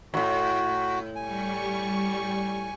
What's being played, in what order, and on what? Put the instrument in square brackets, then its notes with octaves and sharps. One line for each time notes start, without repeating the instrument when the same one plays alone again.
[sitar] D#2 A2 [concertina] F#4
[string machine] G3 C#6 [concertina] G#5